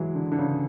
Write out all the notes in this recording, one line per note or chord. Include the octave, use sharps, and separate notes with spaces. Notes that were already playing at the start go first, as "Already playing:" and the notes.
Already playing: E3 F#3 G#3
D3
D3
C#3